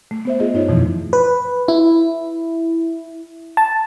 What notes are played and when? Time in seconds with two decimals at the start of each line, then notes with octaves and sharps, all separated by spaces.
0.11 A3
0.25 B3 C5 E5
0.40 F4 G#4 D#5
0.54 G2 D#4 F4 C#5
0.68 F2 B2 E3 F3 A3 E4
1.13 B4
1.68 E4
3.57 A5